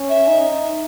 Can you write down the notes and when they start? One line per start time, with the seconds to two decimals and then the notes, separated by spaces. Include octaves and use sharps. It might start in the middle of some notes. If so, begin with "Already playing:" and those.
Already playing: C#4
0.09 E5
0.29 D#4